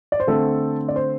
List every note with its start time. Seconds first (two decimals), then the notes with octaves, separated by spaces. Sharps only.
0.12 D5
0.20 C5
0.27 D3 A3 C4 A4
0.88 D5
0.96 C5